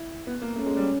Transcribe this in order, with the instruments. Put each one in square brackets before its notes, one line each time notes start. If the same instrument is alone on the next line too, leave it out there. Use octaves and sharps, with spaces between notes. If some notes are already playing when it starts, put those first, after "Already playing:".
Already playing: [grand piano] E4
B3
A#3
[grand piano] A3 [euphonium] C#4
[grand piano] G#3
G3